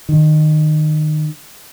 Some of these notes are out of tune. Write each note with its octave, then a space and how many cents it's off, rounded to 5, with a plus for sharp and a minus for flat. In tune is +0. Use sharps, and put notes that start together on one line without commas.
D#3 -20